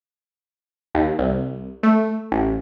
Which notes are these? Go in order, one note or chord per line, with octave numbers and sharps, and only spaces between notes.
D#2
C2
A3
A1